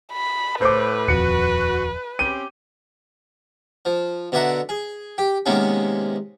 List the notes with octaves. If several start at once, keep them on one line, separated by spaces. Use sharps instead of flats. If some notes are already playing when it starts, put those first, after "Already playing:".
B5
A2 B4 C5 D6
D#1 F2 F#4 C#7
C4 C#4 G4 D#7
F3
B2 D3 D5 E5 F#5 A#5
G#4
G4
C3 D#3 G#3 A#3 B3 C#4